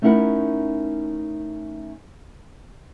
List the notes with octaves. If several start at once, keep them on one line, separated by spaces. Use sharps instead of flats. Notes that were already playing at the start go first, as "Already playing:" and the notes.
A3 C#4 D#4 E4 A#4 F#5